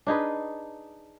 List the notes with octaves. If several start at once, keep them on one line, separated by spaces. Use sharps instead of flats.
D4 D#4 G#4 B4